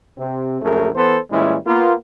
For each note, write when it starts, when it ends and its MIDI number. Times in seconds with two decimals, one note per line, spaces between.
0.18 0.59 48
0.18 0.59 60
0.62 0.90 34
0.62 0.90 42
0.62 0.90 49
0.62 0.90 57
0.62 0.90 68
0.62 0.90 70
0.96 1.18 52
0.96 1.18 59
0.96 1.18 69
0.96 1.18 72
1.31 1.58 46
1.31 1.58 52
1.31 1.58 55
1.31 1.58 56
1.31 1.58 61
1.31 1.58 64
1.66 1.93 58
1.66 1.93 59
1.66 1.93 65